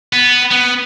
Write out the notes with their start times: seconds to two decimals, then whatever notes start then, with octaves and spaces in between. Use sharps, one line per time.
0.13 B3
0.52 B3